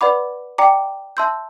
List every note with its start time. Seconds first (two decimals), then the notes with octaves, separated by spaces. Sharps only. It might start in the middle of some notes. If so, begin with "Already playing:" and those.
0.01 B4 D5 F#5 B5 D6
0.58 D5 G5 A#5 D6
1.17 E5 A5 C6 E6 G6